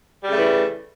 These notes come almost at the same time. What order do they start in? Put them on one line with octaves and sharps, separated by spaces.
G3 C#3 A3 E3